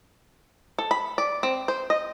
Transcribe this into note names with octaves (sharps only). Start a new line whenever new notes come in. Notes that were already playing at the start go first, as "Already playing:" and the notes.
A4
B5
D5
C4
C5
D#5